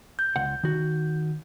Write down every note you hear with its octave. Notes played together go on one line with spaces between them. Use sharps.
G6
C#2 F#5
D#3 F#4